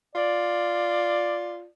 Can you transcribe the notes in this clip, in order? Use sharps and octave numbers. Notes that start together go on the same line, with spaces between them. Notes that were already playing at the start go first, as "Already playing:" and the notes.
F4 D5